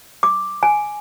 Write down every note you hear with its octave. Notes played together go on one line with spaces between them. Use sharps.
D6
G#5